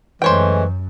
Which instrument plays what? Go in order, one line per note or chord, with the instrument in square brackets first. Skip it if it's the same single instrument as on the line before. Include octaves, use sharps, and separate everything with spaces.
[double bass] F#2 [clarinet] E3 [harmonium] G#3 A3 C#4 [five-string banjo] C5 C#5 G5